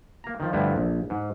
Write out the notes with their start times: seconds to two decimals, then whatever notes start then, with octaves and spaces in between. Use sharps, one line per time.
0.24 A#3 A#5
0.40 D#3 F3
0.53 G2 D3 F3 A3 E4
0.76 A#1
1.10 G#2